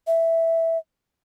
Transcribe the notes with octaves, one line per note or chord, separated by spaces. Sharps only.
E5